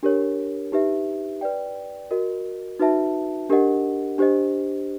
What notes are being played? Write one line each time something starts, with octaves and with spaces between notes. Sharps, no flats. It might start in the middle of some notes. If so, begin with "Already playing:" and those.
D4 G4 A#4 C#5
D#4 G4 B4 E5
B4 D5 G5
F#4 A#4 D#5
D#4 F#4 B4 E5 A5
D4 G4 A#4 D#5 F#5
D4 G4 C5 D#5